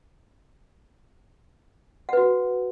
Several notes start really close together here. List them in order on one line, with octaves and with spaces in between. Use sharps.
F#5 B4 F#4